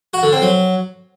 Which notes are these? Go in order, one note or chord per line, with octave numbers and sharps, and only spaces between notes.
F#4
D3
C4
F#3